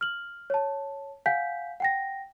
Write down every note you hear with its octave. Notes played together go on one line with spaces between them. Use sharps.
F6 F#7
C#5 A5
F5 F#5 G#5 G6 B6
F#5 G5 A#6